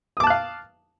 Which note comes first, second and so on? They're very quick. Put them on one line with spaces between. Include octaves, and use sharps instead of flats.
D#6 D6 A5 F#6 F5